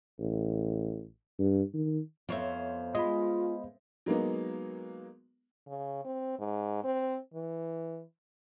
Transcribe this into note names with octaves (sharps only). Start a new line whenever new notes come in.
A1
G2
D#3
F2 B3 C5 C#5 E5 F5
G#3 F4 D#5 B5
F#3 G#3 A#3 B3 D#4
C#3
C4
G#2
C4
E3